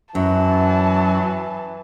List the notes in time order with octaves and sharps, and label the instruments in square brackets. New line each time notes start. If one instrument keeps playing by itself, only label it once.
[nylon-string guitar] F#2 [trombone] E3 [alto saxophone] F#3 [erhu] A5